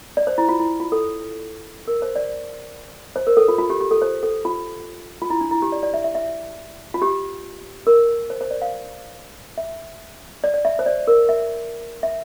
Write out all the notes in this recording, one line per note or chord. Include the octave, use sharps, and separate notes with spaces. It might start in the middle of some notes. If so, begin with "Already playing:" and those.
D5
C5
E4
F4
E4
F4
A4
A#4
C5
D5
C5
A#4
A4
F4
F4
G4
G4
A4
C5
A4
F4
F4
E4
D4
E4
G4
D5
D5
E5
E5
E5
F4
G4
A#4
C5
C5
D5
F5
E5
D5
D5
E5
C5
D5
A#4
E5
E5